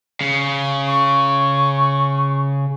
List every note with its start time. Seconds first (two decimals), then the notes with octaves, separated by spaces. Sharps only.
0.21 C#3
0.87 C#6